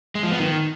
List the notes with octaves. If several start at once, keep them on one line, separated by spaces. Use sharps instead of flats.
G#3
F3
B3
D#3